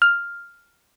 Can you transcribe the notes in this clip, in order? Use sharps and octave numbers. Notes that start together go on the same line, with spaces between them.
F6